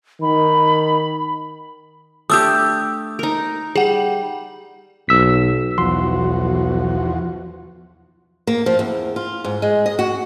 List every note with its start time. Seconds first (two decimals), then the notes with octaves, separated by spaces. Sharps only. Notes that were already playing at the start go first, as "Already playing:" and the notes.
0.22 D#3 B5
2.30 A3 D4 G4 D#6 E6 G6
3.19 D#4 A#4
3.76 G3 G#4 F#5
5.09 B1 E6 B6
5.78 B1 E2 F3 F#4 C6
8.47 A#3
8.66 F3
8.79 E2
9.16 F4
9.44 G#2
9.62 G#3
9.86 D#5
9.99 F#4